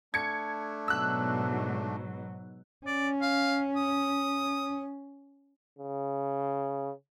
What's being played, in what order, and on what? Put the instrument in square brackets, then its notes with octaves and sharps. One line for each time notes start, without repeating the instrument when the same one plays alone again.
[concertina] A3 D4 [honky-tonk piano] G#6 C#7
[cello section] G#2 B2 F#3 [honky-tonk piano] E6 F#6
[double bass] C#4 [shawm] D5
[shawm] F5
D#6
[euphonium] C#3